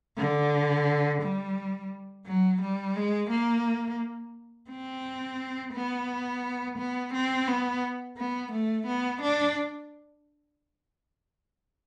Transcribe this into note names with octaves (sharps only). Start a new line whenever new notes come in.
D3
G3
F#3
G3
G#3
A#3
C4
B3
B3
C4
B3
B3
A3
B3
D4